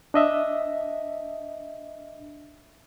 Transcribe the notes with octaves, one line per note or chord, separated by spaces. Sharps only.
D4 D#5 E5